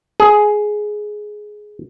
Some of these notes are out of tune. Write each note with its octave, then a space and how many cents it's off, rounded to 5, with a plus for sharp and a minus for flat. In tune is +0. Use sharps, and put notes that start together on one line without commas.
G#4 +10